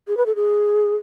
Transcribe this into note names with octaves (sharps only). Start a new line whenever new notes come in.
G#4
B4
A4
G#4